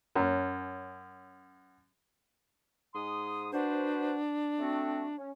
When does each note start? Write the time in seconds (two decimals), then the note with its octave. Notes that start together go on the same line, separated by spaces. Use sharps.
0.15 F#2 C#4
2.94 G#2 C6 D#6
3.52 D4 F#4 B4 C5
4.59 A3 C4 F#4
5.17 C#4